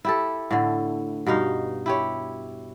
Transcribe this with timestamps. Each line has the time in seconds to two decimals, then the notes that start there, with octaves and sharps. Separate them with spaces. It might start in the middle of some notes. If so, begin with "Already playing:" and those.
0.05 E4 G4 A4
0.51 A2 D3
1.26 G2 B2 D#4 F5
1.86 E4 G4 C#5